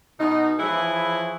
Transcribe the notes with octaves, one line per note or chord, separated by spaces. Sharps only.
B2 D#4
E3 F3 E4 G#4 C#5